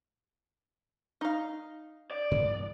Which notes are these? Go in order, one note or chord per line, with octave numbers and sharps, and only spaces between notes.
D#4 F5
D5
G2 E3 B3